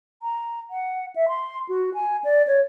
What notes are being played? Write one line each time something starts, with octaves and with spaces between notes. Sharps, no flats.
A#5
F#5
E5
C6
F#4
G#5
D5
C#5